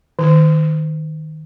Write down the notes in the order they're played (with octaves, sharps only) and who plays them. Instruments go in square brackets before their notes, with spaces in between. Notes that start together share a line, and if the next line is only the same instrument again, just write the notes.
[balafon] D#3